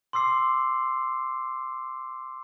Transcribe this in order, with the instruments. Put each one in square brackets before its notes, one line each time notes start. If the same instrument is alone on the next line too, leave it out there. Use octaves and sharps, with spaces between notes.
[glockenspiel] C6 D6 E6 C7